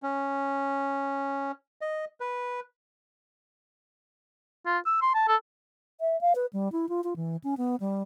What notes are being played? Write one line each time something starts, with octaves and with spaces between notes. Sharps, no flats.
C#4
D#5
B4
F4
E6
C6
A5
A4
E5
F5
B4
G3
E4
F4
F4
E3
C#4
B3
G3